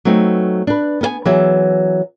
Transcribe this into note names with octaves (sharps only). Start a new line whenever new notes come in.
F#3 A3 B3 C4 D#4
D4 B4
B3 A#4 G#5
E3 F#3 B3 G#4 E5